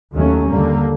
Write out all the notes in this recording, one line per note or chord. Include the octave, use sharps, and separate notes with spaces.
D#2 D#3 F#3 A3 C#4
D#2 D3 G3 A#3